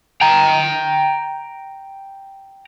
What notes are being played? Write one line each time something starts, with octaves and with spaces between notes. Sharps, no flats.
G5 A#5